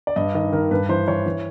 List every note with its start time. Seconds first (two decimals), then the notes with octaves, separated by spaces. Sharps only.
0.07 D5
0.16 G2 D#5
0.34 D#3 D#5
0.52 D#3 A#4
0.71 G2 B4
0.89 E3 C5
1.08 E3 C#5
1.26 E3